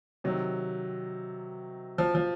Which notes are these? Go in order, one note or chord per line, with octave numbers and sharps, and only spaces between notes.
C3 D#3 F#3
F3
F3